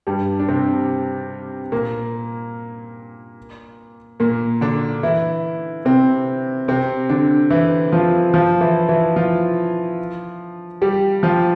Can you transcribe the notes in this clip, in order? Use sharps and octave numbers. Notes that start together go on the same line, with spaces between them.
G2 G3
D4
C3 C4
A#2 A#3
A#2 A#3
D3 D4
E3 E4
C3 C4
C3 C4
D3 D4
E3 E4
F3 F4
F3 F4
E3 E4
E3 E4
F3 F4
G3 G4
F3 F4